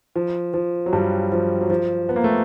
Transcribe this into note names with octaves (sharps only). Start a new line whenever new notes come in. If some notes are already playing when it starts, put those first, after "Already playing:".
F3
F3
F#3
G2 G3
F3
F#3
F3
B3
A#3
A3